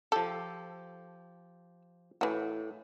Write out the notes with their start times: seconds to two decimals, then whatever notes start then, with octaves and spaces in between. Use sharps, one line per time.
0.12 F3 G4 A4
2.21 A2 E3 F#4